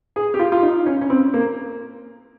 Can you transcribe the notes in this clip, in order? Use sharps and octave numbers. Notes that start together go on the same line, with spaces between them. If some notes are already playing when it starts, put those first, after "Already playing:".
G#4
G4
F4
F4
D#4
C#4
C#4
C4
A#3